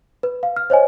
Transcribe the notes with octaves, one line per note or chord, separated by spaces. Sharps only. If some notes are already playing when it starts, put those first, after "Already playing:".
B4
F5
F6
C5 C#5 D#5 G#5